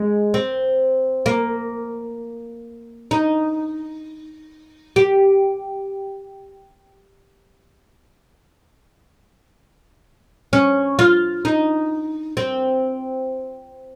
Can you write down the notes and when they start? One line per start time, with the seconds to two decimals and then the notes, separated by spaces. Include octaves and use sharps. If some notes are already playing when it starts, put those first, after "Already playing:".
Already playing: G#3
0.34 C4
1.26 A#3
3.11 D#4
4.96 G4
10.53 C#4
10.99 F4
11.45 D#4
12.37 C4